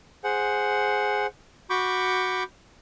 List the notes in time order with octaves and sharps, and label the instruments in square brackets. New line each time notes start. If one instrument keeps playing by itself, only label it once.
[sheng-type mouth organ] G#4 C5 F#5
F#4 B5 C#6 D6 G6